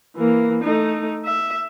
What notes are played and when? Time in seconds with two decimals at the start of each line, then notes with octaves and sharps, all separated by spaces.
0.16 E3 A#3
0.64 A3 D#4
1.25 E5